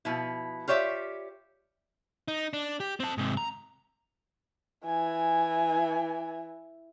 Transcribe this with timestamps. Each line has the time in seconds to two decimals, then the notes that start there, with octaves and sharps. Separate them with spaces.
0.05 B2 F3 E4
0.68 F4 G4 C#5 D5 E5
2.28 D#4
2.53 D4
2.80 G4
3.00 C4 A5
3.18 G#2 C3
3.37 A#5
4.86 E3 G#5